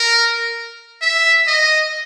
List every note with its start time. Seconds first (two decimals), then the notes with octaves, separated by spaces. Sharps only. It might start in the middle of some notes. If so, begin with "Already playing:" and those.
Already playing: A#4
1.02 E5
1.48 D#5